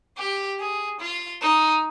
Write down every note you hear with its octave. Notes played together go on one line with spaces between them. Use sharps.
G4
G#4
F4
D#4